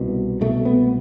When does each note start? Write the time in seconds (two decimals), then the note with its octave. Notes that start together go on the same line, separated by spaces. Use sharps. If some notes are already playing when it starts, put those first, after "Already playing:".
Already playing: C2 B2
0.41 C2 B2 A3
0.65 B3